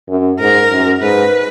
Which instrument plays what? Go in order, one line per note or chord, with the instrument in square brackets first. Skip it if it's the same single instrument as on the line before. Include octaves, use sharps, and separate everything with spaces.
[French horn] F#2
[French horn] G#2 [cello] A#4
[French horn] F#2
[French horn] G#2 [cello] B4